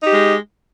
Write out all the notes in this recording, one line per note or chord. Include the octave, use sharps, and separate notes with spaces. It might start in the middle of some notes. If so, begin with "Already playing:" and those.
G#3 D#4 G4